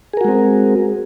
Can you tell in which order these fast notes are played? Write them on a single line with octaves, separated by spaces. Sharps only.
G#4 A#4 F#4 G#3 C4